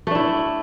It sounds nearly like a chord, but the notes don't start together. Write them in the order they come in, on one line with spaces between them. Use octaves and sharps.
A3 D4 E4